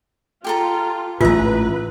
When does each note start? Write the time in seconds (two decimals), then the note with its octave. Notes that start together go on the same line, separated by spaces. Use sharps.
0.44 F4 G4 A4 A#5
1.21 A1 G#2 F4 B4 E5 A#5